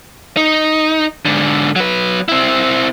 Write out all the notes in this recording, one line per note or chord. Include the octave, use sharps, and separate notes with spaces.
D#4
G#2 D3
F#3 B4
C4 E4